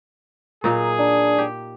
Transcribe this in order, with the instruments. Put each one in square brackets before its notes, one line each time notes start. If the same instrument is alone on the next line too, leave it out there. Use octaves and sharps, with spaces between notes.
[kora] A#2 F#3 D#4 [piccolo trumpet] G#4
[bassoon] D4
[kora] G4